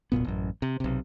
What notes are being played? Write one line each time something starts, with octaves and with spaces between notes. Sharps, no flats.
E1 B1 A#2 B3
A1 F#2
C3
B1 C3